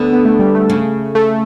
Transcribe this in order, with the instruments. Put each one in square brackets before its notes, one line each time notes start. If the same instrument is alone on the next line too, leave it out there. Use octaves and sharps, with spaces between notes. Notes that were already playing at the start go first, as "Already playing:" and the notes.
Already playing: [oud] D2 D3 [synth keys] B3
[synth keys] B3
A3
G3
A3
[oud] C#3
[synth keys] A3